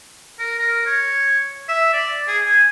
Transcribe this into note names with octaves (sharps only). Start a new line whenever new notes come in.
A#4
A#4
C#5
E5
D5
G#4
G#5